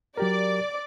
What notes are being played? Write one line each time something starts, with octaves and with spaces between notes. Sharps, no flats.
F#3 G4 A#4 D5 D6